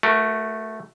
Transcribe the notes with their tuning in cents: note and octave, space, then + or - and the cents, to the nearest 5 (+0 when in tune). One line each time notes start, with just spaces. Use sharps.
A3 +0 F#4 +0 A#4 +30